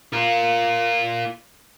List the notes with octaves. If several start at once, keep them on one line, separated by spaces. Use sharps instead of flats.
F4 A#4